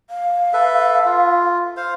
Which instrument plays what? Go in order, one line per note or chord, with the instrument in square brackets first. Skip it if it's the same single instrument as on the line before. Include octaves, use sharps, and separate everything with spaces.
[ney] F5
[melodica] A4 B4 E5
F4
C5 F5